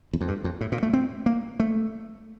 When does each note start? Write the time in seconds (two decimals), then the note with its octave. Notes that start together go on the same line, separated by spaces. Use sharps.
0.13 E2
0.21 F2
0.28 G2
0.44 F2
0.61 A2
0.72 A#2
0.83 A3
0.93 C4
1.26 A#3
1.60 A3